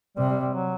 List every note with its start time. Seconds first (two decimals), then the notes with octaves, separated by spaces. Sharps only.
0.17 C3 G3
0.30 G3
0.41 G3
0.54 F#3